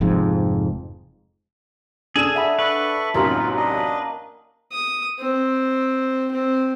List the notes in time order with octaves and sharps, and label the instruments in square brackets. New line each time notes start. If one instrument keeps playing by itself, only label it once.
[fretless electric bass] F1 F2 G#2
[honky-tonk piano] D4 D#7 E7 [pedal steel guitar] G#4 [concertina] A4
[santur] E5 F#5 B5
[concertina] A4 C#6 [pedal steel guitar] B4
[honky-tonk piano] A1 F#2 C3 [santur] A#3 C#4 D#4 [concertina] F4
[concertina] D4 D#5
[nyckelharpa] D#6
C4
C4